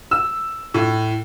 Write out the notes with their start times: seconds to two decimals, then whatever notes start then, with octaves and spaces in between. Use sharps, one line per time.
0.11 E6
0.74 A2